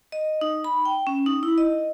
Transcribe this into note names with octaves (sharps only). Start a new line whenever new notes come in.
D#5
D#4
B5
G5
C#4
D#4
E4
D#5